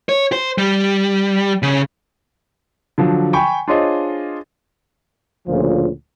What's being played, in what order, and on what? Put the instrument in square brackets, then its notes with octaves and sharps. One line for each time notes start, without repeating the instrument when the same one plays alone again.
[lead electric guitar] C#5
C5
G3
C#3
[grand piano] D3 F3 F#3
G5 G#5 B5 C#6
D4 F4 G#4 C5 C#5 D#5
[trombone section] D2 A#2 C#3 F3